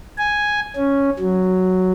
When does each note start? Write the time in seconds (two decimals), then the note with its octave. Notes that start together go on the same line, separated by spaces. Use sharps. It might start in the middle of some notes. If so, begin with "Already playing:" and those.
0.18 G#5
0.76 C#4
1.19 F#3